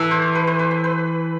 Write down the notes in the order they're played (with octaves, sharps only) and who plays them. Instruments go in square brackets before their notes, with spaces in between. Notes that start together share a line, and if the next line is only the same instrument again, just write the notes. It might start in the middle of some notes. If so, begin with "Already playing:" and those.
Already playing: [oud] E3 [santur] A4
[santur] C5
B4
C5
B4
C5
B4